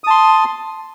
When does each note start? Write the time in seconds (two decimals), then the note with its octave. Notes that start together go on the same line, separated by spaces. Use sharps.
0.04 D#6
0.07 A5
0.10 C6